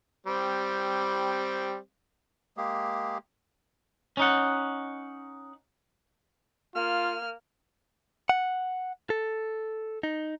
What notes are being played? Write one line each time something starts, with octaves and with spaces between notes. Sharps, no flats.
G3 C4
G#3 A#3 G4 G#4
C#4 D#4 F#5
A#3 F4 F6
F#5
A4
D#4